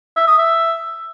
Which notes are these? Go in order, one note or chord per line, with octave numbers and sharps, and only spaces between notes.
E5
D#6
E5